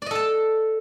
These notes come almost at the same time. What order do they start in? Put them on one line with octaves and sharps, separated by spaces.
D5 D#5 A4 A5